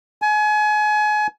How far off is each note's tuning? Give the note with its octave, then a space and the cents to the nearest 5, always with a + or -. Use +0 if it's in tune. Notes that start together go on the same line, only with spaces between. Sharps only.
G#5 +30